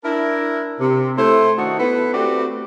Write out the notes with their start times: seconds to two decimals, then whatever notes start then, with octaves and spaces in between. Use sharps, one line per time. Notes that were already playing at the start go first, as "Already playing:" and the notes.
0.04 D4 E4 A#4
0.80 C3
1.18 A3 E4 C5
1.58 D#3 D4 D#4 F#4
1.79 B3 E4 A4 B4
2.14 A3 C4 F#4 G4 B4 D5